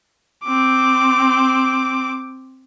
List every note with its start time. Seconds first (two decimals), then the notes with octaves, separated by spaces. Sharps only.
0.44 C4 D6